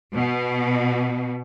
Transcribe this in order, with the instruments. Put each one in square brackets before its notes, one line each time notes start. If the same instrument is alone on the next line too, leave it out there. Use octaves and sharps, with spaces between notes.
[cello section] B2